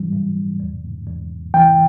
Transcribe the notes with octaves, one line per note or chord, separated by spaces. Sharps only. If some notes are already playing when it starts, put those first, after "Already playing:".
Already playing: E3 G3
F#2
E2
E2
E3 G5